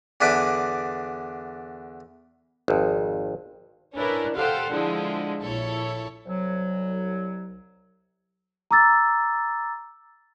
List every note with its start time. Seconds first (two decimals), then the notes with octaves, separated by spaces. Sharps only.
0.21 E2 D3 D4 B4 B5 D6
2.68 G#1 F2
3.95 C#4 D4 E4 A#4 B4
4.36 G4 A4 C5 F5 F#5
4.70 D3 F3 G#3 E4
5.43 A#1 E4 A4 C#5
6.25 C2 F#3
8.71 A#5 D6 E6 A6